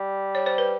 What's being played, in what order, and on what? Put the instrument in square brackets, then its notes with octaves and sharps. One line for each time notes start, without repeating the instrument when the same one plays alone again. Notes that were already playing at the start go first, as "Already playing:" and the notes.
Already playing: [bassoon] G3
[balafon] C#5
C5
B4